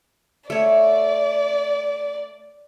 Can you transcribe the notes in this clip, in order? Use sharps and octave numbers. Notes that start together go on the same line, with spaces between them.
A3 C#5 D5